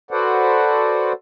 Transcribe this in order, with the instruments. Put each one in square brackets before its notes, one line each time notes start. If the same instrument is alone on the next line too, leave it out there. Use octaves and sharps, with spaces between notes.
[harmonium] F#4 A4 B4 C5 D5 F#5